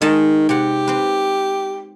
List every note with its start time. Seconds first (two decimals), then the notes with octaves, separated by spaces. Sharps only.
0.02 D#3 G#3 D#4 A5
0.49 C3 G4 F#5
0.88 C4 B4